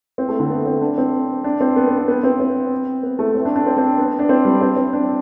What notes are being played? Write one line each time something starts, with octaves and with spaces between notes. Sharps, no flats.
C4
A3
D3
B3
C4
D4
C4
D4
C4
B3
B3
C4
B3
C4
C4
B3
A3
C4
D4
D4
C4
C4
B3
D4
C4
G3
C4
C4
D4